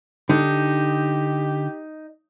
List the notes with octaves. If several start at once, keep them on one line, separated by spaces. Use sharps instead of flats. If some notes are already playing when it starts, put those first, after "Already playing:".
D3 D#4 G4